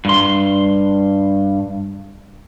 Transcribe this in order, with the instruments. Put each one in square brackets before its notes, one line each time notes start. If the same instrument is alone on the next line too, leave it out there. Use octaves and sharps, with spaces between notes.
[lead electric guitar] G2 C6